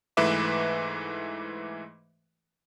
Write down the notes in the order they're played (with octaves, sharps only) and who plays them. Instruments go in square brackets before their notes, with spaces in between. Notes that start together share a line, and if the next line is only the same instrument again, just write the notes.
[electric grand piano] G#2 E3 A3 B4 E5 D6